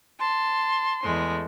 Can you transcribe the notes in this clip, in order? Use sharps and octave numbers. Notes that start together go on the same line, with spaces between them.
A5 C6
E2 G#3 A3